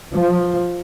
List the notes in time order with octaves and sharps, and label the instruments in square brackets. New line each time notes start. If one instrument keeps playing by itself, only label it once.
[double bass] F3